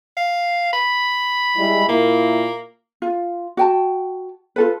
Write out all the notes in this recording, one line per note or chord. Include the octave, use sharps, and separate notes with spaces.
F5
B5
G3 G#3 E4
A#2 A#3 E4 A#4
F4
F#4 G5 A5
F4 A4 B4